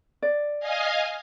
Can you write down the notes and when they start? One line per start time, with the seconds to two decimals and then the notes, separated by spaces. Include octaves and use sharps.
0.22 D5
0.60 D#5 F5 G#5